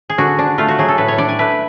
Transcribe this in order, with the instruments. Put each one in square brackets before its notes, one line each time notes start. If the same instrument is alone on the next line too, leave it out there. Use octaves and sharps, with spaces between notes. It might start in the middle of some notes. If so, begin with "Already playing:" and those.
[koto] G#4
D3 F#4
D4
A3 F4
F#4
F#3 G#4
A4
A2 B4
C#5
D4 D5
G#5
A3 B4